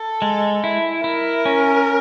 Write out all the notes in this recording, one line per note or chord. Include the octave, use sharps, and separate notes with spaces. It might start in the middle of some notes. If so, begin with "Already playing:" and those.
Already playing: A4
G#3
E4
E4 A#4
C#4